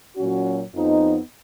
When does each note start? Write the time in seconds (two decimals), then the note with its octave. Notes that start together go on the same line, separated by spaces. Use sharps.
0.15 A#2 F#3 C#4 F#4
0.72 F2 F3 B3 D#4